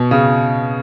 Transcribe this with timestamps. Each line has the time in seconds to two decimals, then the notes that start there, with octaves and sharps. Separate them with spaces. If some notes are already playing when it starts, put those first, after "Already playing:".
Already playing: B2
0.11 C#3